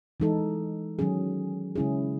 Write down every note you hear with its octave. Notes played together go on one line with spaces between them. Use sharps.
E3 G#3 D#4 A4
D#3 F#3 C#4 G#4
C#3 G#3 C#4 E4 G#4